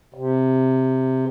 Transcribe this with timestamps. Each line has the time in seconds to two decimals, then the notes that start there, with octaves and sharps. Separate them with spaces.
0.14 C3